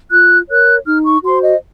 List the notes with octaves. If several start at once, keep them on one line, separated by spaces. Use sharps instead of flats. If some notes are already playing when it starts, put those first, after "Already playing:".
F4 F#6
A#4 C#5 F#6
D#4 F6
C#6
F#4 C5 C6
D#5